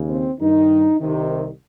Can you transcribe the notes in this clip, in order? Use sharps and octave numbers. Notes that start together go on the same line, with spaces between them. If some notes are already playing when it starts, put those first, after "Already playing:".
Already playing: D#2 C#3
C4
G2 D#3 D#4
C2 C3 D#3